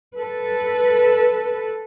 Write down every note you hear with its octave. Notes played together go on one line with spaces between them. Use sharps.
A4 B4